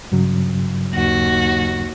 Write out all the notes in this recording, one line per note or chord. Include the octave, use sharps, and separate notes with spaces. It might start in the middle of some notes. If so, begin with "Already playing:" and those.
G2 C#3 F#3
D#2 F#4